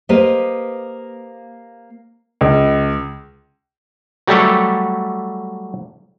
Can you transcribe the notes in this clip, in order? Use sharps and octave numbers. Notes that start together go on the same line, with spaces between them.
A#3 G4 B4 C5 D#5
C#2
F#3 G3 A3 G4 A4